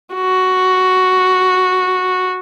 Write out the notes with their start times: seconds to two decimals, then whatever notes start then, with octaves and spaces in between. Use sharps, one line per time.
0.15 F#4